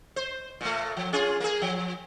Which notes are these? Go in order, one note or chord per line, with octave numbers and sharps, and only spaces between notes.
C5
A#2 A3
F3
C#4 F4 G#4
A#3 G#4
F3